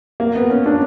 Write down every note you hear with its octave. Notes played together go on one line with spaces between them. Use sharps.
A#3
B3
C#4
D4